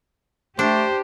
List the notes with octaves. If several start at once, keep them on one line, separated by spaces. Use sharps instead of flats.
A3 D4 G4 C5